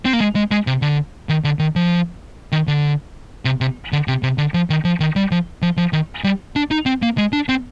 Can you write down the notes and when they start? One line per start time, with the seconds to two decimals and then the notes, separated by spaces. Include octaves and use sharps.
0.05 C4
0.13 A#3
0.20 G#3
0.36 G#3
0.51 G#3
0.67 C3
0.82 D3
1.29 D#3
1.44 D3
1.59 D#3
1.76 F3
2.52 D#3
2.67 D3
3.45 C3
3.61 C3
3.93 D3
4.08 C3
4.23 C3
4.38 D3
4.54 F3
4.70 D#3
4.85 F3
5.00 D#3
5.16 G3
5.31 F3
5.62 F3
5.77 F3
5.93 D#3
6.24 G3
6.56 D4
6.71 D#4
6.86 C4
7.02 A#3
7.18 G#3
7.33 D4
7.49 C4